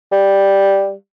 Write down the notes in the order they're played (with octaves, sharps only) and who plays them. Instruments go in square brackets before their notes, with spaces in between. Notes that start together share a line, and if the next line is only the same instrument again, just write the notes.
[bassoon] G3